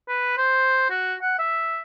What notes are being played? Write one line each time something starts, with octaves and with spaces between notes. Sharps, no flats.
B4
C5
F#4
F#5
E5